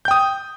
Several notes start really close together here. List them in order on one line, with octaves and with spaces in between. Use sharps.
G6 G5 D#6